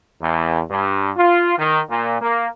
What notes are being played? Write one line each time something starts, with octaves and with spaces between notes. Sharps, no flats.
E2
G2
F4
D#3
A#2
A#3